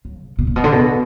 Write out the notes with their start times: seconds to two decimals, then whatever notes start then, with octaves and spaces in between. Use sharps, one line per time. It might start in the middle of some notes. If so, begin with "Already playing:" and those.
0.05 F#3
0.22 B2
0.39 B2
0.47 A#2
0.56 B2
0.64 D3
0.72 B2